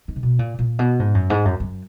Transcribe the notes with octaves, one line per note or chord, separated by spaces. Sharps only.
D#3
C#3
B2
A#2
A#2
B2
G#2
F#2
G#2
F#2
F#2